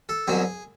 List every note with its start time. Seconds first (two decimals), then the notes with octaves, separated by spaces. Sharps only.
0.09 A4
0.27 C2 B2 F#3 G#4